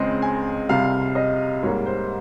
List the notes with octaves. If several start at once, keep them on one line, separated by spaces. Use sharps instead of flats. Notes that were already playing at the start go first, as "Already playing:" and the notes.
Already playing: C#2 C#3 G#3 C4 D#5
G#5
C2 C3 G3 F5
D#5
G#2 G3 A#3 C#5
C5